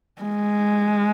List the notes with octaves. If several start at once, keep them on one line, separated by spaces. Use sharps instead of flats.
G#3